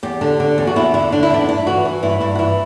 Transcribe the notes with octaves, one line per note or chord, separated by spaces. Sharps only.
E2 G4
D3
D3
E2
F#4
E2 E4
D3 E4
D3 D4
E4
E2 D4
G2 E4
E3 F#4
E3
G2 E4
G2 E4
F#4
E3 E4